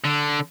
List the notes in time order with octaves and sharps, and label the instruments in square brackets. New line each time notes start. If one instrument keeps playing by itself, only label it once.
[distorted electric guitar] D3